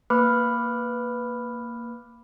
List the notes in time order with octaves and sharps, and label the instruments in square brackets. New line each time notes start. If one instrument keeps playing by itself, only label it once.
[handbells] A#3 B4 B5 D6 F6